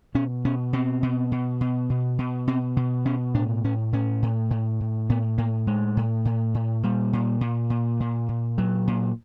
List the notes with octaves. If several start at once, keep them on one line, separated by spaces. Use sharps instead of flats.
B2 C#4
B2 C#4
B2 C4
B2
B2
B2
B2
B2
B2 C4
B2
B2 C#4
A2 D4
A2 C#4
A2 C#4
A2
A2
A2
A2 B3
A2 A#3
A2 G#3
A2
A2
A2
A#2 G3
A#2
A#2
A#2
A#2
A#2
A#2 F#3
A#2